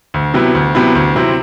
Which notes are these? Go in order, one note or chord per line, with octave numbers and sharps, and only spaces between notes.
D2
C3 F#3 B3 E4
D2
C3 F#3 B3 E4
D2
C3 F#3 C4 E4